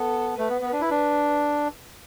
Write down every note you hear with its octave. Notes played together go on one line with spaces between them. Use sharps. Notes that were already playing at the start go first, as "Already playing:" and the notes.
Already playing: B3 A4
A3 B4
B3
B3
D4
E4 B4
D4